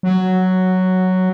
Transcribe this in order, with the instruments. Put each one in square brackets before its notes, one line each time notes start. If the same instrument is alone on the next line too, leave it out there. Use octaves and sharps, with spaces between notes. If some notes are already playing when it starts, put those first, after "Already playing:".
[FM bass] F#3